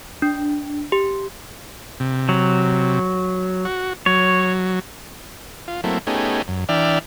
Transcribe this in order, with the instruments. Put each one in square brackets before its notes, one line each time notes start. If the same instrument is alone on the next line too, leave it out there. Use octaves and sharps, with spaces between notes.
[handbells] D4
G4
[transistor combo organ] C3
[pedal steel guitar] F#3
[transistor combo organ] F#4
[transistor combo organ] F#3 [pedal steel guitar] C#5
[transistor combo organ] F4
F#3 A3 A#3 C4 E4
A3 B3 C#4 D#4 G4 G#4
F#2
E3 D4 D5 E5 G5 F6